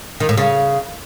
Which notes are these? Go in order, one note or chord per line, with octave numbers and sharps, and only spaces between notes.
D#3
A2
C#3